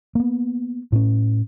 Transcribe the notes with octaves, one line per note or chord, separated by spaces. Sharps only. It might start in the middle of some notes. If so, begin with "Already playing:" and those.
A#3 B3
A2 C#4